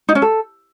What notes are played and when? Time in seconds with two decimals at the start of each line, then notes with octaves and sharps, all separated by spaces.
0.09 D#4
0.15 C#4
0.22 A4